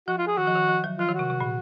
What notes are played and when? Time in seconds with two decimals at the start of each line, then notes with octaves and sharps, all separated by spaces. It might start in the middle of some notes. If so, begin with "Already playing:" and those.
0.08 F3 F#4
0.18 F4
0.27 G#4
0.37 D#3 F#4
0.47 F3
0.56 D#3
0.68 F3
0.84 F#3
0.99 F3 F4
1.09 D#3
1.14 F#4
1.19 C3
1.30 C3
1.40 A#2